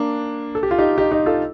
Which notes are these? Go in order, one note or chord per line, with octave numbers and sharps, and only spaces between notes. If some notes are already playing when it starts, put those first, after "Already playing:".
Already playing: A#3 D4
A4
G4
F4
D#4 G4
D#4 G4
D#4 G4
F4 A4